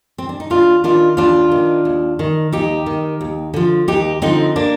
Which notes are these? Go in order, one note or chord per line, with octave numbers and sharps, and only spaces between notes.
C4
D4
D#4
D#2 D4 F4
D#3 D4 F4
D#2 D4 F4
D#3
D#2
D#3
D#2 D#4 G4
D#3
D#2
D3 F3
D#2 D#4 G4
D3 F3 C4 D#4
A#3 D4